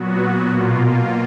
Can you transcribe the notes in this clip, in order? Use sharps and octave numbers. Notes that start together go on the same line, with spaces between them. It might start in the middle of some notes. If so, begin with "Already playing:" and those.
Already playing: A#2 F#3 B3 F#4
B2 A#3 F4